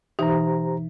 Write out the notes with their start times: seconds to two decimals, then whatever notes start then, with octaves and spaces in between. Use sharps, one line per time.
0.19 B2 E3 D#4 G4 C5 A#5